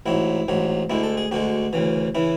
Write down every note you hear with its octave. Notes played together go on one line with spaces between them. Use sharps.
A1 G#2 F#3 E4
A1 G#2 F#3
D2 D3 G#3 E4
A4
G#4
D2 D3 G#3 F#4
D2 C#3 E3
C#3 E3 E4